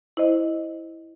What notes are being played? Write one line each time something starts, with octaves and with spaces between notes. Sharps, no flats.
E4 C5 D#5